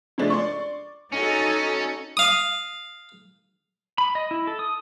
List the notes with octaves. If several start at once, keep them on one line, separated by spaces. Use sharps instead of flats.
C#3 F3 G#3 A3 D4 A6
D5 C6 C#6
C#4 D#4 F#4 A4
F5 D#6
B5
D#5
E4
A4
D#6